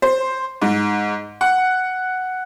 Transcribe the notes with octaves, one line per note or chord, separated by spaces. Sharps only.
C5
G#2
F#5